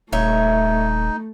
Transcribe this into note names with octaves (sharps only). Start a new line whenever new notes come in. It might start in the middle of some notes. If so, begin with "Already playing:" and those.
D#1 A3 D#4 C#5 D#5 E5